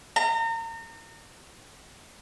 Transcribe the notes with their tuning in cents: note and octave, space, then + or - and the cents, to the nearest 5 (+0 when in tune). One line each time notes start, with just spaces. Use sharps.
A#5 -35